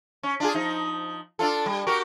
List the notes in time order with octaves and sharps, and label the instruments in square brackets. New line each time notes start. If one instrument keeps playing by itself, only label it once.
[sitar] C#4
D4 F4 G#4
F3 D#4
D4 F4 A4
G3
F#4 G4 A#4